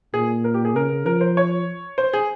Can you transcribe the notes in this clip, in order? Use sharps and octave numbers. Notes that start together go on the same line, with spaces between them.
A#2 G#4
A#4
G4
G#4
C#3 A#4
F3 A#4
C5
C#5
C5
G#4